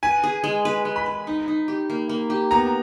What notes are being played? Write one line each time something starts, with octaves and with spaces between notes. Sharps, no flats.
B4 G#5
G#4
G#3
B4
G#3
B5
B4
D#4
D#4
G4
A#3
A#3
G4
B3 A#5